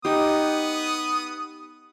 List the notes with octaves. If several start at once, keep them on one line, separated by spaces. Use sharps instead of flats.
B3 D#4 G4 D#6